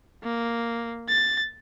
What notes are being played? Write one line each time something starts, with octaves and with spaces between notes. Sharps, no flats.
A#3
A6